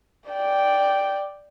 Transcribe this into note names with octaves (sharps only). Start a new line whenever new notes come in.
D5 G5